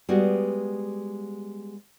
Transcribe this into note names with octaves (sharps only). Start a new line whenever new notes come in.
G3 G#3 B3 F#4